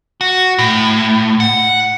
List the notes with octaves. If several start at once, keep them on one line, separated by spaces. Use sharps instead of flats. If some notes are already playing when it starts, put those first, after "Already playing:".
F#4
A2
F#5